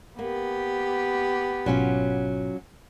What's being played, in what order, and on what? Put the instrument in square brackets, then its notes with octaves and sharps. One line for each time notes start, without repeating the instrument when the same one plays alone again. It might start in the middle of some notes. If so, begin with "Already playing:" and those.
[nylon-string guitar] A#3 [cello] B3 G4
[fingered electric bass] G#1 B2 [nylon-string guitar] F#3 C#4 F4